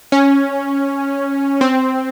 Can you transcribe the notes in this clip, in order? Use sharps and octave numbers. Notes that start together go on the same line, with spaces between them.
C#4
C4